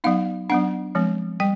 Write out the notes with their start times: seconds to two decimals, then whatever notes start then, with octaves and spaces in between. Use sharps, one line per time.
0.04 F#3 B3 D#4 F5
0.50 F#3 B3 D4 F#5
0.95 F3 G#3 C4
1.40 G3 G5